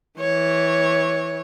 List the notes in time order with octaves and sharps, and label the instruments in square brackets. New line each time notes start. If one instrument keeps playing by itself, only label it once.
[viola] E3 C#5